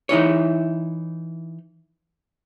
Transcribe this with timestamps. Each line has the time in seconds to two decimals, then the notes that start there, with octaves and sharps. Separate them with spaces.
0.09 E3 D#4 E4 C#5